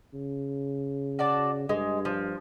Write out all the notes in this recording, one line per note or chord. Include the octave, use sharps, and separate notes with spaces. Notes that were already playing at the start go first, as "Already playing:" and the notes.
C#3
F#4 D5 A5
G2 G#3
F3